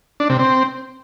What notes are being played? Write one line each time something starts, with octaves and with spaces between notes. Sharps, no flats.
D4
C3
C4